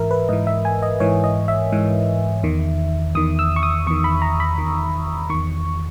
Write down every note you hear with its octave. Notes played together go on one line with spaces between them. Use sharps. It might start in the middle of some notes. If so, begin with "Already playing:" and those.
Already playing: G#2 E3 A#4 E5
B4
G#2 E3 D#5
E5
G#5
D#5
G#2 E3 C#5
D#5
E5
G#2 E3
E2 D#3
E2 D#3 D#6
E6
C#6
D#6
E2 D#3 C#6
B5
A#5
B5
E2 D#3
E2 D#3 C#6